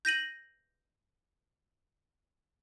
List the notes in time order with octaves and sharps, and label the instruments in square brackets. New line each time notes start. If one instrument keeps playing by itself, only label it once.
[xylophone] G6 A#6 D#7 F#7